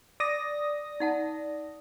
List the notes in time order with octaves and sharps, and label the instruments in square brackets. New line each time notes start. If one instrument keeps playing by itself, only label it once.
[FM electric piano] D5 D#6 A#6
[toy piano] D#4 F#5 A5